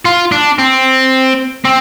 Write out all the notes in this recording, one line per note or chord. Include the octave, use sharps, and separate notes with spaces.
F4
D4
C4
C4